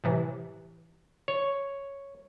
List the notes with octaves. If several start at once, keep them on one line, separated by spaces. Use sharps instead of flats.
A2 C3 E3
C#5